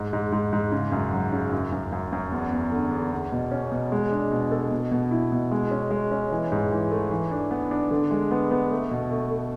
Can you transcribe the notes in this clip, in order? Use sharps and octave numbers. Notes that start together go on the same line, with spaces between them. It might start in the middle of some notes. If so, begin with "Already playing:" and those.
Already playing: G#2
G#2
G#2
G#2
C#3
F#2
F#3
C#3
F#2
F#2
F#2
F#2
E2
E2
D3
E2
E2
B2
C#4
B2
G#3
D4
B2
A4
B2
B2
E4
B2
G#3
C#4
G#3
C#4
E3
G#2
E3
A3
E3
D4
B3
D4
D3
G#3
B3
B3
A3
B2
A3
A3